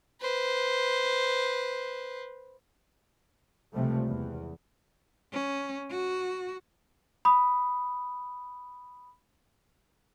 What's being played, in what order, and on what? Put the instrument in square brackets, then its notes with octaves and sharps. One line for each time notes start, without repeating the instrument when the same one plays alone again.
[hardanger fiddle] B4 C5
[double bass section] C#2 C3 F3 G3 A3
E2
[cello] C#4
F#4
[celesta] B5 D#6